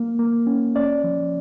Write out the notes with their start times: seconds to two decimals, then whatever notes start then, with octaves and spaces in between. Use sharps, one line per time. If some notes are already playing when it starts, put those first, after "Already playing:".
Already playing: A#3
0.19 A#3
0.47 C#4
0.75 C#4 D5
1.04 F3